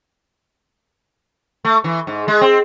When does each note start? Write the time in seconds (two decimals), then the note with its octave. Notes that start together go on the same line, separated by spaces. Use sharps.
1.65 A3
1.84 E3
2.07 G#2
2.28 G#3
2.41 C4